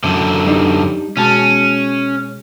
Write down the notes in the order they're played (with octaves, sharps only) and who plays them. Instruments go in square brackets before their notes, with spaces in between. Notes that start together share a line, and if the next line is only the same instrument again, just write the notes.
[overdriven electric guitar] F#2 D3
[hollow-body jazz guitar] G3 D4 D#4
[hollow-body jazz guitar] B2 G#3 A5 [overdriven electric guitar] C#4